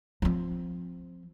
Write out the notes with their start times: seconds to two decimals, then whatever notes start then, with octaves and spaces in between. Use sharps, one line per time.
0.22 F3 C4